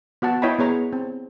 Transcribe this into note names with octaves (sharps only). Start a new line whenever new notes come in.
B3 F#4 F#5 A5
E4 C#5 D#5 G5 B5
B3 G#4 C#5 A#5
C4